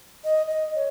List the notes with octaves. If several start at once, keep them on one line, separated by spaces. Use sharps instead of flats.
D#5
D#5
C#5